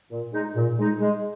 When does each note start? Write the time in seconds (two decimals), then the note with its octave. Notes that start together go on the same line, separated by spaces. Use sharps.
0.11 A#2
0.34 G#3 D#4
0.56 A#2
0.79 G#3 D#4
1.01 G#3